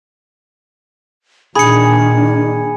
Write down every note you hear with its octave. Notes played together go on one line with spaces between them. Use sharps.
A#2 D#3 D4 G#4 B5 C#7